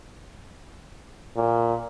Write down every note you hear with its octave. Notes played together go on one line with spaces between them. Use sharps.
A#2